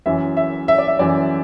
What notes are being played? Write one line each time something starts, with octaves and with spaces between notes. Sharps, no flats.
F#2 E3 E5
E5
E5
D5
E5
F#2 E3 D5